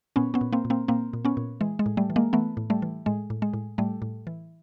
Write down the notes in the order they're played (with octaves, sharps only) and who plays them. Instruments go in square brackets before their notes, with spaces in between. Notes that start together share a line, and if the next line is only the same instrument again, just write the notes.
[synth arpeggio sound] A#2 B3 C#4
B3 C#4
A#2
A#3 C4
A#2
A#3 C4
A#2 A#3 C4
A#2
B3 C#4
A#2
E3 G#3
G#3
A2
G3 A3
E3
G#3 A#3
E3 A3 B3
A2
G3 A3
E3
A2 G#3
A2
G#3
A2
A2 G3 A3
A2
E3